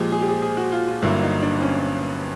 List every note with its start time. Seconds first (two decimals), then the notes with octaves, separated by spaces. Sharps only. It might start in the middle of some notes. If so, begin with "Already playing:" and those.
Already playing: A#2 F3 G#3 G4
0.12 G#4
0.21 G4
0.28 G#4
0.42 G#4
0.57 F#4
0.72 F4
0.88 F4
1.02 G1 G2 D3 F#3 A#3 E4
1.23 D#4
1.42 D4
1.58 C4
1.62 C#4